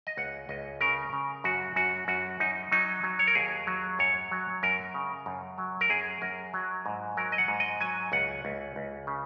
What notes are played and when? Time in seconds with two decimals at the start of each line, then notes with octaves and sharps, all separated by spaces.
0.07 D#5
0.17 C#2 F#5
0.49 C#2 D#5
0.81 C#3 A#4
1.13 C#3
1.44 F#2 F#4
1.76 F#2 F#4
2.08 F#2 F#4
2.40 F#2 D#4
2.72 F#3 D#4
3.04 F#3
3.19 C#5
3.28 A#4
3.35 D#2 G#4
3.67 F#3
3.99 F#2 C#5
4.31 F#3
4.63 F#2 A#4
4.94 C#3
5.26 F#2
5.58 F#3
5.81 A#4
5.90 F#2 G#4
6.22 F#2 A#4
6.54 F#3
6.86 G#2
7.17 F#3 A#4
7.32 D#5
7.38 F#5
7.48 G#2
7.60 D#5
7.81 F#3 G#5
8.12 C#2 F#5
8.45 C#2
8.76 C#2
9.07 C#3